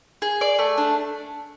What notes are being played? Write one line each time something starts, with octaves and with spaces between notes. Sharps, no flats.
G#4
D5
A3
D4